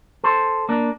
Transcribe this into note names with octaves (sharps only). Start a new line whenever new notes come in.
A4 C5
A#3 D4